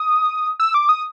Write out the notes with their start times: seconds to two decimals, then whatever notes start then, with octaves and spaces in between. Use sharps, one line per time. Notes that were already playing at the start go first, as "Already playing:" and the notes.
Already playing: D#6
0.60 E6
0.74 D6
0.89 D#6